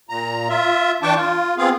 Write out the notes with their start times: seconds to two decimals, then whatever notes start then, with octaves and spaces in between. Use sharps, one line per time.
0.09 A#2 A#5
0.49 F4 E5
1.02 E3 D4 G5 A5 C#6 D6
1.15 F4
1.58 B3 C4 F4 G#4 F5